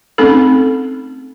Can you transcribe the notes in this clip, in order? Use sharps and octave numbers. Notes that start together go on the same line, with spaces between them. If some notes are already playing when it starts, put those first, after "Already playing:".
A3 C4 C#4 D#4 G#4 A4